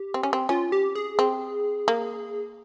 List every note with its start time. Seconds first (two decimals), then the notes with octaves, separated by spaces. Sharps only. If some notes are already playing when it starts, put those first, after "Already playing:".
Already playing: G4
0.14 C4
0.23 C#4
0.33 C4
0.49 C#4 F4
0.72 G4
0.95 G#4
1.19 C4
1.88 A#3